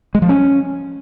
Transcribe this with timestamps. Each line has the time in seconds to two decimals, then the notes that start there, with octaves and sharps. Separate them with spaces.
0.15 G#3
0.22 F3
0.29 C#4